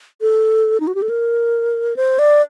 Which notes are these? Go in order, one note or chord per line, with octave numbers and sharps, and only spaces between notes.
A4
D#4
F#4
G4
A4
A#4
C5
D5